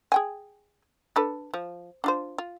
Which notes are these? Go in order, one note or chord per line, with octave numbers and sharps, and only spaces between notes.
G#4 G5 G#5
D4 A4 B4
F3
D4 F4 C5
F4